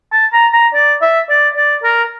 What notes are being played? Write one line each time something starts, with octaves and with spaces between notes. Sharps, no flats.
A5
A#5
A#5
D5
E5
D5
D5
A#4